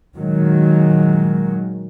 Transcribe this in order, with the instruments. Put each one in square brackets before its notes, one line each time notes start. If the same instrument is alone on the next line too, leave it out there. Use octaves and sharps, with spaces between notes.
[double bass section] A#2 D#3 F#3 G#3